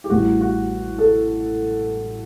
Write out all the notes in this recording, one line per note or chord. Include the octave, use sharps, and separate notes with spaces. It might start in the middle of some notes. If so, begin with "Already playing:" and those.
G4
A1 A2 G3 F#4
F#4
A4